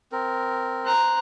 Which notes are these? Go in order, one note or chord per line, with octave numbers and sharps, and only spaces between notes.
C4 A#4
C5 A#5 F#6